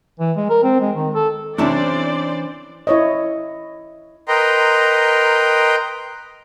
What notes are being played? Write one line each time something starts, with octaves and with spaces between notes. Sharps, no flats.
E3
G#3
A#4
C4
G#3
D#3
A4
C3 E3 C#4 D4 E4 C5 D5 A5
E4 C#5 D#5
A#4 B4 D#5 G5 A#5 C6